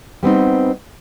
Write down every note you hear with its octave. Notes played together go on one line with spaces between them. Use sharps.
G3 B3 C4 D#4